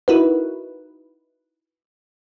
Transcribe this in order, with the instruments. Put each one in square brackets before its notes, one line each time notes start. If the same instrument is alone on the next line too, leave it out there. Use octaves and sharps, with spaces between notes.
[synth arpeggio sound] D#4 E4 F#4 A#4 B4